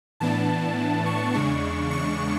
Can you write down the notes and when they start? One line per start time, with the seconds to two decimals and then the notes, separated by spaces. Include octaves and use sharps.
0.20 A2 E3 B3 D4 A5
1.06 C#6
1.34 E2 C#3 G#3 D4 C#6
1.91 C#6